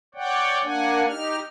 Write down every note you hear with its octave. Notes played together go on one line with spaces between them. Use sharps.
C#5 D5 F#5 G5
A#3 D4 F#5 G#5
D#4 G4 F6